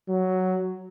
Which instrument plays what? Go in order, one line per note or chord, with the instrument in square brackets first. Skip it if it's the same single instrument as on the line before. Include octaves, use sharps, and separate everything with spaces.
[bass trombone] F#3